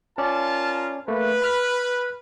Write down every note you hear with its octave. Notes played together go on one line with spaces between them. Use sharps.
C#4 F4 A#4 D5 A5
A3 A#3 B4
B5 F6 F#6